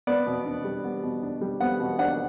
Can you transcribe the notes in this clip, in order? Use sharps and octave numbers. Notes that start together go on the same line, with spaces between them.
B3 D5
B2
D4
G3
B3
B2
D4
G3
B3 F#5
B2
D4 F#5